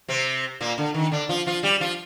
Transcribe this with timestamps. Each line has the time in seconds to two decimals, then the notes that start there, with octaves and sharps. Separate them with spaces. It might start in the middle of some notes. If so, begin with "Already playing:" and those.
0.08 C3 C4
0.61 A#2 A#3
0.78 D3
0.94 D#3
1.12 D3 D4
1.29 F3 F4
1.46 F3 F4
1.63 G3 G4
1.80 F3 F4